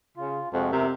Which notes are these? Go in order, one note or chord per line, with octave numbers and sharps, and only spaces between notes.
C#3 F4
F2 C3 G#3 F#4
E2 C3 A#4 E5